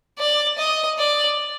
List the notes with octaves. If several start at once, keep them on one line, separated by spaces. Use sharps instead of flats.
D5
D#5
D5